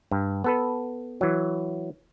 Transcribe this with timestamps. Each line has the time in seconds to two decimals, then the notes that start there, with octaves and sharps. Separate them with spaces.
0.11 G2
0.44 B3 A4 B4
1.21 E3 F#3